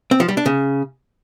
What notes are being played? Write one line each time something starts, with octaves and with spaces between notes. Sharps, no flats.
C4
F3
G3
D4
C#3